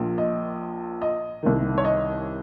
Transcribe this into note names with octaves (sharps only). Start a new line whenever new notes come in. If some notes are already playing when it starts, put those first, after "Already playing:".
Already playing: A#1 A#2 F3
D#5
D#5
C2 C3 D#3
C#5
D#5